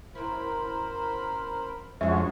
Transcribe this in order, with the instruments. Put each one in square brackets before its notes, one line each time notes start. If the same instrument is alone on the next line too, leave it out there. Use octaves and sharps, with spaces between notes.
[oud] F#2 E4 [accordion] A#4 C5 B5
[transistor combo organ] F2 G#3 C#4 [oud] D4 F#4 [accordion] C5 [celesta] E5